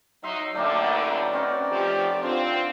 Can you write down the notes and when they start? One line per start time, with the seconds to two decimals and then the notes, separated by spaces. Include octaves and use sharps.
0.24 F#3 D#4 E5 C6
0.55 F#2 D3 A3 A#3 G4 D5
0.85 D#4 B4 B5
1.33 C4 C#4 F#4
1.71 F3 A3 G4
2.23 D3 C4 F4